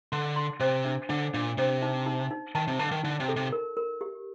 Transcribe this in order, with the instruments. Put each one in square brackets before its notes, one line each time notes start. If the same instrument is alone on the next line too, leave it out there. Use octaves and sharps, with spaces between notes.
[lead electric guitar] D3 [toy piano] C6
[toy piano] C6
[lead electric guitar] C3 [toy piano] C5
[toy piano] D4
[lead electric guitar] D3 [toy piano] D4
[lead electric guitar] A#2 [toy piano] D4
[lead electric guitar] C3 [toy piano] C5
[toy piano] D#4
D#4
D#4
[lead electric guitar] D#3 [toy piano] A5
[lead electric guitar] C3
[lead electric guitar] D3 [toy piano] A5
[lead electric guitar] D#3
[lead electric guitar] D3 [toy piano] D#4
[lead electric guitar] C3
[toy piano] A4
[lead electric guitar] C3
[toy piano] A#4
A#4
G4